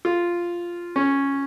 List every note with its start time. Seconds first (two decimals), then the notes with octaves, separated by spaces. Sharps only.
0.05 F4
0.96 C#4